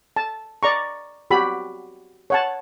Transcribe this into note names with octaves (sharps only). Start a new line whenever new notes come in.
A5
D5 A#5 C#6
F#4 G4 B5
C#5 F#5 A5